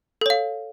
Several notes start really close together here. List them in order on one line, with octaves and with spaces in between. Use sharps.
A4 C#5 F5